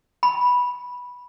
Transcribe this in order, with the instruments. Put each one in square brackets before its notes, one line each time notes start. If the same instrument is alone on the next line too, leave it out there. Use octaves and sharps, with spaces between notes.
[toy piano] B5